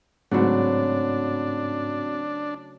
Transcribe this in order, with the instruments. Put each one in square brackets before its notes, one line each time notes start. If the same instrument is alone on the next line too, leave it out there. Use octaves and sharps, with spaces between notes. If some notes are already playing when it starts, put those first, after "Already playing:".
[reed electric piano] G#2 [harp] C#3 F#3 A3 [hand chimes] C4 F#4 [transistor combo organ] D4